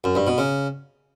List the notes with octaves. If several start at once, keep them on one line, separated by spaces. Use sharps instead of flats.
F#2
G2
B2
C#3